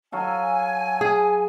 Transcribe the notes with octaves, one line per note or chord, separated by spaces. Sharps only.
F#3 A4 F5 G#5
G#4